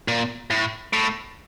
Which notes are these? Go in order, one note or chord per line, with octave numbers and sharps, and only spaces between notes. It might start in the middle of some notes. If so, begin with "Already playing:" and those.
A#2
A2
A2